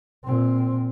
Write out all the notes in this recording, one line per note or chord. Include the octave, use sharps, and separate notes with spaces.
A#2 C4